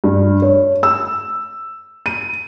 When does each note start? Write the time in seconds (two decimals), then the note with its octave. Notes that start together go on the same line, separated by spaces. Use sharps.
0.04 G2
0.42 C#5
0.83 E6
2.06 D#7